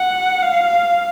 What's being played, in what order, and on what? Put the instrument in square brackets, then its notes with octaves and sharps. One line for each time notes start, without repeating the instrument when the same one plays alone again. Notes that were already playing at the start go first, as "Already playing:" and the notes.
Already playing: [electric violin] F#5
F5